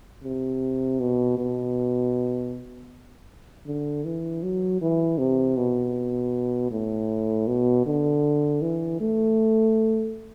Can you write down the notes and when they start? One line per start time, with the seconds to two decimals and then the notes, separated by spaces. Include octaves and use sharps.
0.23 C3
1.00 B2
1.38 B2
3.66 D3
4.04 E3
4.43 F#3
4.81 E3
5.18 C3
5.57 B2
6.71 A2
7.47 B2
7.86 D3
8.62 E3
9.00 A3